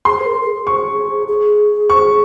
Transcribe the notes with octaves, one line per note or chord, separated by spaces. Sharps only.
G#4 C6
C5
A#4
A#4
G#4
C#6
G#4
C#6